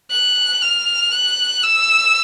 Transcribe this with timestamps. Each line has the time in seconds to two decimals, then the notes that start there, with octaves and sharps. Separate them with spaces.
0.11 F#6
0.62 F6
1.12 F#6
1.63 E6